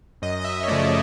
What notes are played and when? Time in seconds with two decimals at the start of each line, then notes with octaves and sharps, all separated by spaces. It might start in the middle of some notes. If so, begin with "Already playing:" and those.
0.22 F#2 D#5
0.41 D#5
0.45 E5
0.63 C#5
0.68 C#3 F3 A3 D5